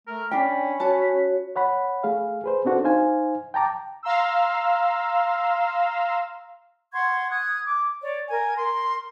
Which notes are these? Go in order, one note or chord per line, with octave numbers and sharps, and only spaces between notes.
A3 A#4
C#4 D4 G5 B5
F#4 C#5 A5
C#5 F#5 B5
A3 G#4 F5
G#4 B4 C5
B3 C4 D4 F#4 A4 C5
D#4 C5 F5 G#5
G5 A5 A#5 D6
F5 A#5 C6 E6
F#5 C6 C#6 G#6
D#6 F#6 G#6
D6
C#5 D5
A#4 G#5
A#4 C6